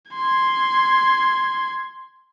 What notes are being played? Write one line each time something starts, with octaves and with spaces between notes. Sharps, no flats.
C6 G#6